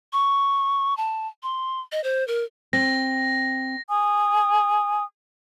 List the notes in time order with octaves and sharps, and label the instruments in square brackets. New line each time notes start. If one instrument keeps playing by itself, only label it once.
[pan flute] C#6
A5
C6
D#5
C5
A#4
[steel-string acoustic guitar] C4 [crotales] A#6
[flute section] G#5 D#6